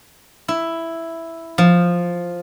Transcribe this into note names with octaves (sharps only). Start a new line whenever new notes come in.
E4
F3